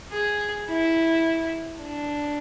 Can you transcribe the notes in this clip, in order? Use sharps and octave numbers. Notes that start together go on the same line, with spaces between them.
G#4
E4
D4